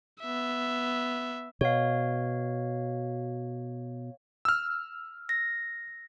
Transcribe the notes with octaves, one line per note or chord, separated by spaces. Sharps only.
B3 E5
B2 C#5 F5
E6 F6
A#6